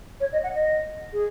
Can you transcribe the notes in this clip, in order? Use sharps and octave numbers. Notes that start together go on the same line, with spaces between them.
C#5
D#5
F#5
D#5
G#4